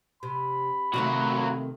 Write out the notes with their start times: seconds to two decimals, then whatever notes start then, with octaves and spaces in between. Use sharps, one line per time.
0.23 C3 B5
0.94 C3 D#3 F#3 A3 A#3 F#4